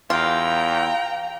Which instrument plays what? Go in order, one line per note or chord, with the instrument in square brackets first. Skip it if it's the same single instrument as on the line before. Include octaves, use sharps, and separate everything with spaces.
[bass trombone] E2 [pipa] F4 [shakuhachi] F5 [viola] G5 A#5